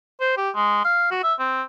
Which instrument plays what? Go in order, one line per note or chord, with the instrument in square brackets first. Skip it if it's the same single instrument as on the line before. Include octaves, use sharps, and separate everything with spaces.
[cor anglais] C5
G4
G#3
F5
F#4
E5
C4